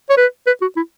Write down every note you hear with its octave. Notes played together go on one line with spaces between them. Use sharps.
C#5
B4
B4
F#4
E4